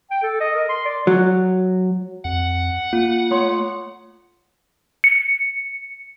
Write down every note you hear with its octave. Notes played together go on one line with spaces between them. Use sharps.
G5
A4
D#5
A#4
C6
D5
F#3
F2 F#5
A#3 F4
A3 F4 C#5 C6
C#7